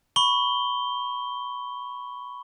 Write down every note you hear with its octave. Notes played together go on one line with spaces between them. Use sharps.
B5 C#6 G7